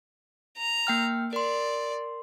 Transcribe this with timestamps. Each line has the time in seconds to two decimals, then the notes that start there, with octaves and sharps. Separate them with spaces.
0.58 A#5
0.87 A#3 G5 F6
1.33 A#4 D5 C6